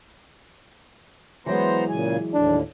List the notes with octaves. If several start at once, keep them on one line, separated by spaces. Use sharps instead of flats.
E3 F#3 G#3 B3 C5 A#5
A#2 C#3 G#5
D#2 A2 D4